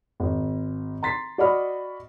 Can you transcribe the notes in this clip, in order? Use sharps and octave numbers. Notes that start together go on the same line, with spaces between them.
G#1
A#5 C6 A6 B6 C7
F#4 D5 D#5 F#5 B5 F6